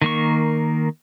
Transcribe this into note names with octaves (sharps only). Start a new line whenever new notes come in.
D#3 A#3 C#6